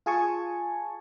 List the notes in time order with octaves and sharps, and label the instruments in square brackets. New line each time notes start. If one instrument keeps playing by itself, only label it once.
[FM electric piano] F4 G#4 G#5 A5 C#6